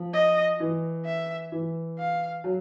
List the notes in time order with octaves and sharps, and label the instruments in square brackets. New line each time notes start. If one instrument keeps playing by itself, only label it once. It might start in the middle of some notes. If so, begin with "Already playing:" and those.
Already playing: [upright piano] F3
[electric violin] D#5
[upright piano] E3
[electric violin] E5
[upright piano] E3
[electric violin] F5
[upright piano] F#3